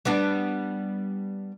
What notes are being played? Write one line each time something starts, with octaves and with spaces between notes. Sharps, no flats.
G3 B3 D4